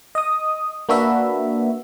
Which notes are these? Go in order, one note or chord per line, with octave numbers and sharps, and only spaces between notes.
D#5 D#6
A#3 D4 F#4 B4 E5